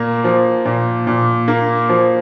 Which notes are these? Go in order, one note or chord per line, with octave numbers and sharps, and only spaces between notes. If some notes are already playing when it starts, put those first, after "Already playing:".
Already playing: A#2 A#3
F3
A#2
A#2
A#3
F3